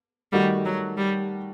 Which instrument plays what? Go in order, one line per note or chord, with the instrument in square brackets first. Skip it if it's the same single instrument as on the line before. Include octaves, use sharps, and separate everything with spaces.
[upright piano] D#3 A3 D#4 F#4 [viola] G3
[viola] F#3
G3